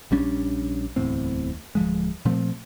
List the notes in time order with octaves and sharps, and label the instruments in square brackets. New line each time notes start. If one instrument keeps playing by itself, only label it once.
[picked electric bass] A#1 G3 C#4 D4
D1 E2 A2 C4
D1 F3 G#3
A#2 F3 A3 C4